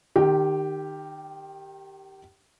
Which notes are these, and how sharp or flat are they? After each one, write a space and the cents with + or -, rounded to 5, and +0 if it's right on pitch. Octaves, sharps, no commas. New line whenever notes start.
D#3 -25 G4 +0